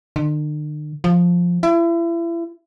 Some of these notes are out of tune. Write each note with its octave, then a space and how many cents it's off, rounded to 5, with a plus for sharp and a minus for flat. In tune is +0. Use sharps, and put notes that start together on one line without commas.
D3 +45
F3 +5
E4 +35